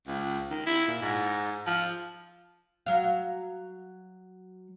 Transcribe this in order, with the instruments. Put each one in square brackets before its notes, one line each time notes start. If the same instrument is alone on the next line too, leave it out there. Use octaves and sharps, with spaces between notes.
[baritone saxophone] C#2
D#3
E4
A#2
G#2
F3
[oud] F#3 F5